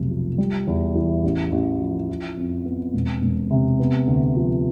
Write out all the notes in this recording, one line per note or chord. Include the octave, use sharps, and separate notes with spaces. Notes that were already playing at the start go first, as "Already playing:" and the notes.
Already playing: F1 B1 C3 A3
F3
G3
E2
E3
A1
A1
F3
E4
F2
B3
E1
E1
C3
B3
D2
F3